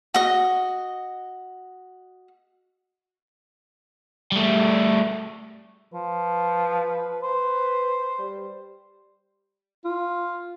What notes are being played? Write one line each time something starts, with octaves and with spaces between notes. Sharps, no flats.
F#4 D#5
G3 A3
F3 B4
B4 C5
G3
F4